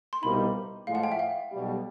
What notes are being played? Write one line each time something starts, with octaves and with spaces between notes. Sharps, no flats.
C6
C2 B2 G3 A#3 D#4 B5
A2 F3 G#3 F5
F#5
G5
E5
F5
B1 B2 G3